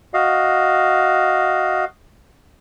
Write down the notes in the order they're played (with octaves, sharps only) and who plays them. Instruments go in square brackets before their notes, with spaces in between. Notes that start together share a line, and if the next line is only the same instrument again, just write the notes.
[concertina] F#4 D#5 F5